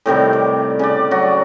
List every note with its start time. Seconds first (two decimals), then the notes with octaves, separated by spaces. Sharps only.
0.06 A2 C3 D#3 G3
0.33 D6
0.79 C#3 D5
1.11 F#3 F#4